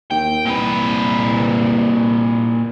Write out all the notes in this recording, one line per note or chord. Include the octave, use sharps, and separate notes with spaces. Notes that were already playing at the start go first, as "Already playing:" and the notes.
D#2 G5
C2 A#2 B4